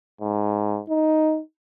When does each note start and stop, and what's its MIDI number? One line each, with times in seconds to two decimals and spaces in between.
0.21 0.80 44
0.89 1.40 63